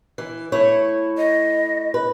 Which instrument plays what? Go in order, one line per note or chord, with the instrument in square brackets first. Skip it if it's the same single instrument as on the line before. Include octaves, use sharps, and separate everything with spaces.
[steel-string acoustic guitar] E3
A3 E4 C#5
[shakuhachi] D#5
[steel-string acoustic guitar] B4